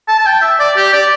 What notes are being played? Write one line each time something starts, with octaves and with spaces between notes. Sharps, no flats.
A5
A5
G5
E5
D5
G4
D5